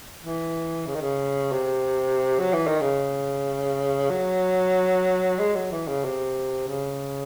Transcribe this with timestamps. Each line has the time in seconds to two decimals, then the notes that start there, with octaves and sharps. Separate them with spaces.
0.22 E3
0.87 C#3
0.95 D#3
1.01 C#3
1.52 C3
2.39 F#3
2.53 E3
2.67 D#3
2.81 C#3
4.10 F#3
5.39 G#3
5.55 F#3
5.72 E3
5.88 C#3
6.05 C3
6.68 C#3